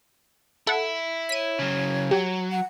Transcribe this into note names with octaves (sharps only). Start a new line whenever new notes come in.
E4 A4 F#5
C#5 B6 D#7
C#3 F#3
F#3 G4
F#5